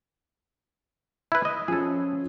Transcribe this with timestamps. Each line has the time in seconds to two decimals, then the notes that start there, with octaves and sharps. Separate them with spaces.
1.32 E4 B4
1.45 D#5
1.68 F3 C#4 G#4 A4